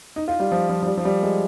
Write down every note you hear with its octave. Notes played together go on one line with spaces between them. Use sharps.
D#4
F4
G3
F3
F3
F3
G3
F3
G3
G#3